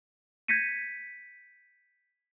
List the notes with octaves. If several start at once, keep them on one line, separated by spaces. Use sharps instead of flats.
G6 G#6 A#6 B6 C#7 D#7